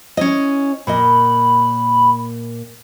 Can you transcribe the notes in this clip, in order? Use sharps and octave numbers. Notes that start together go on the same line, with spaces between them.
C#4 E4 D#5
A#2 A#4 D#5 B5